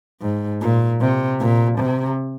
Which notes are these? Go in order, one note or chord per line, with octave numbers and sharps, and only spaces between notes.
G#2
A#2
C3
A#2
C3